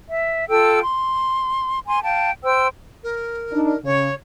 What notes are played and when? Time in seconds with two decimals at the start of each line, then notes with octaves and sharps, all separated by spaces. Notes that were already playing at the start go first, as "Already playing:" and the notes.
0.09 E5
0.48 F4 A4 G5 E6
0.80 C6
1.86 G#5 C6
2.04 F5 G5 A5
2.43 C5 G5 E6
3.03 A#4
3.53 D4 D#4
3.84 C#3 C#5